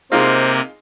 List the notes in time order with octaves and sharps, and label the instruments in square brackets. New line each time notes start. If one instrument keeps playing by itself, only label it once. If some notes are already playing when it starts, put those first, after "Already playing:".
[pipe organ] C3 A#3 [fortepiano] G#3 D#4 F4 [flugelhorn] C5